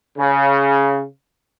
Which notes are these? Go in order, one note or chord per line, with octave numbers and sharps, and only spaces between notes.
C#3